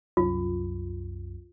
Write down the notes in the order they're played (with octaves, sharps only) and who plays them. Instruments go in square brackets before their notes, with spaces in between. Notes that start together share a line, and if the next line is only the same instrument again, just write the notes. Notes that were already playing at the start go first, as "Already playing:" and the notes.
[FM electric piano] C2 F#2 [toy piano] F4